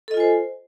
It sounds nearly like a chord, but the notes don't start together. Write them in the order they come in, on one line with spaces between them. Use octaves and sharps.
A4 D#5 F4 G#5 C5